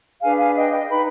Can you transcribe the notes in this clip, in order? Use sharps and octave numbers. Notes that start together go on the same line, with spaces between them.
D4 G#4 B4 F5 G#5
F5 G#5
D#5 G5
D#5 G5
D#4 B4 G5 B5